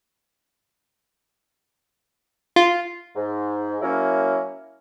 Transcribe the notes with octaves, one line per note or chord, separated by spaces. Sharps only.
F4
G#2
F#3 A#3 C#4 E4